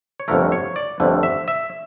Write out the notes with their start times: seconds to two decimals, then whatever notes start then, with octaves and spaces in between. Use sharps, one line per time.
0.20 C#5
0.28 G1 F2 D3 F3 A3 A#4
0.52 C#5
0.76 D5
1.00 G1 F2 D3 F3 A3
1.23 E5
1.48 E5